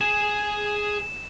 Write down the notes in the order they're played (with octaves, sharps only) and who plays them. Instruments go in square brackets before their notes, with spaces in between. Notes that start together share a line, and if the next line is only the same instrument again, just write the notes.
[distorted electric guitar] G#4 G#5 [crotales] E7